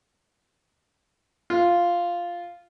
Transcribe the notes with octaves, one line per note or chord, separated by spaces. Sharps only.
F4